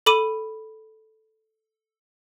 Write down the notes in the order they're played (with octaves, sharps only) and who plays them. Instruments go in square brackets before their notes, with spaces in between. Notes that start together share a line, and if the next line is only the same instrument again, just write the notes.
[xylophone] A4 B5 D6 D#7